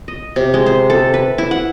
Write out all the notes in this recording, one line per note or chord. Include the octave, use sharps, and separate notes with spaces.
D#5
C3
G#3
C5
A4
B4
E4
F#5